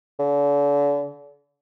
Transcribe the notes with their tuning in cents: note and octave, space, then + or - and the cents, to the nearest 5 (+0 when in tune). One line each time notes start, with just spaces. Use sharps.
D3 -40